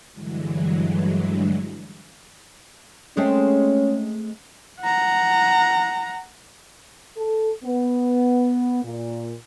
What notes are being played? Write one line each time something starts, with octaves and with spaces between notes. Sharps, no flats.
G2 D3 E3 F#3 G#3
G#3 A3 C4 C#4
F#5 A#5
A4
B3
A#2